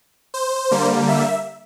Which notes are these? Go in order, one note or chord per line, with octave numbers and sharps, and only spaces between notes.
C5
D3 G3 A#3
E5